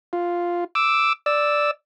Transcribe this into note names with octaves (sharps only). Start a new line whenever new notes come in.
F4
D6 E6
D5 E6